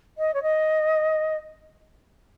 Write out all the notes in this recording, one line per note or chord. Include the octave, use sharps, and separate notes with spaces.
D#5
C#5
D#5